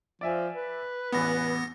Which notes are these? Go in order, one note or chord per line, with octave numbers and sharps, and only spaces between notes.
F3 D5 E5 G#5
B4
A1 E2 B3 B5 A#6